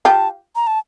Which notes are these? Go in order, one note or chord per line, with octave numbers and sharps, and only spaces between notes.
F4 G4 A5
A#5
A5